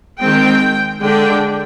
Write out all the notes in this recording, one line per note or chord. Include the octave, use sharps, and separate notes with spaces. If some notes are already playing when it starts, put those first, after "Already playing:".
D#3 G#3 C4 G5
D3 G#3 D4 G5